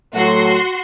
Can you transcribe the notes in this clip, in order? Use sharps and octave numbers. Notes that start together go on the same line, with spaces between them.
A2 F#3 A3 F#4 C6